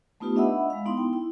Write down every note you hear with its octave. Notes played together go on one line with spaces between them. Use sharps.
A3 B3 D#4 F4 G4 B4
D4 D#5 E5 F#5 B5 E6
G#3 F5
B3 D#4 E4 C6
G5
E4